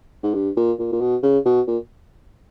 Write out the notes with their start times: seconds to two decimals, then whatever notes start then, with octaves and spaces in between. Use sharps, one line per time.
0.23 G#2
0.34 G2
0.57 A#2
0.79 A#2
0.92 A#2
1.00 B2
1.23 C#3
1.45 B2
1.67 A#2